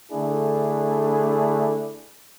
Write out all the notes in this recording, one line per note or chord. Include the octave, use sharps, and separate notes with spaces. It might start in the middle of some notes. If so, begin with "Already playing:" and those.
D3 A3 D4 E4 G#4